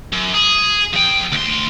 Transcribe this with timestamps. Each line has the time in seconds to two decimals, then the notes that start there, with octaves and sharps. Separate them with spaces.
0.13 F#2
0.34 G#4
0.94 F3 G5
1.32 D2 C6